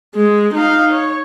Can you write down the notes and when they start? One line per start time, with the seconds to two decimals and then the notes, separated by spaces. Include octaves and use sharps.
0.15 G#3
0.54 D#4 F5
0.93 C#5